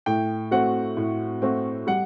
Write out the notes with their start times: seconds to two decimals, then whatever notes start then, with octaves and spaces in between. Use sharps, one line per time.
0.06 A2 G5
0.51 A3 C4 F#4 F#5
0.97 A2
1.42 A3 C4 F#4
1.87 G3 F#5